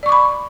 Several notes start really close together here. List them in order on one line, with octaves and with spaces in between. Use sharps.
D5 C#6 D6 B5